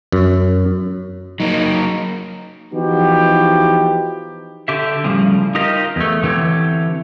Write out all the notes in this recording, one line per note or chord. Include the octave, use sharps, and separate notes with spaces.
F#2
F#3 A#3 D#4
E3 F3 B3 D#4 F#4 G4
D3 G4 E5
A2 C#3 F3 G3
D#4 F4 G4 A#4 D#5
E2 A3
D3 E3 C4 G4 C#5